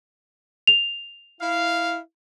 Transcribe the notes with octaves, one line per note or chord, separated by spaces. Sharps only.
F7
E4 F5